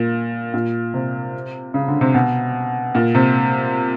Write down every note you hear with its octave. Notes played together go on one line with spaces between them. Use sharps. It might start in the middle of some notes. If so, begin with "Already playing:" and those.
Already playing: A#2
A#2
C3
C#3
D3
C3
B2
A#2
C3